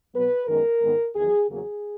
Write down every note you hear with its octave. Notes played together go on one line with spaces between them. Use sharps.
B2 F#3 B3 B4
F#2 D#3 G#3 B3 A#4
G#2 D#3 G#3 B3
E2 D#3 F#3 G#4
E2 C#3 F#3 A#3 G#4